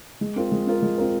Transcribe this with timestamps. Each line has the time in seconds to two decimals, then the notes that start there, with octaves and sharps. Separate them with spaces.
0.21 G#3
0.36 C4 F4 A#4
0.52 G#3
0.67 C4 F4 A#4
0.83 G#3
0.98 C4 F4 A#4